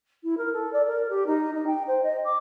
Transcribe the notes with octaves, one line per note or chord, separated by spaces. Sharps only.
E4
A#4
A4
D5
A#4
G4
D#4
D#4
G5
C5
D#5
D6